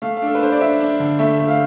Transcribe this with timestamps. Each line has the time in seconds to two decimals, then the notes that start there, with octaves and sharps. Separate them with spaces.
0.02 A3 F5
0.17 F5
0.22 D4 A4
0.35 B4
0.41 D4 C5
0.52 D5
0.60 D4 E5
0.80 D4
1.00 D3
1.19 A3 E5
1.39 A3
1.48 F5